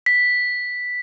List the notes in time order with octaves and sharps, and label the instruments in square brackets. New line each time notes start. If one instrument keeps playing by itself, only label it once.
[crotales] B6